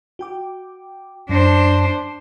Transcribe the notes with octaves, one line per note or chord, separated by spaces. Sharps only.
F#4 G5 D6
F#2 D4 C5 A#6 C#7